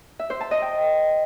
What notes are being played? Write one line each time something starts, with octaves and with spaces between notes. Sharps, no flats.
E5
C5
A5
D#5
G5